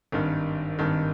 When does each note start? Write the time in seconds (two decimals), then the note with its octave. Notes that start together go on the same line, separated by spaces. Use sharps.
0.12 G#1 G2 D#3
0.79 G#1 G2 D#3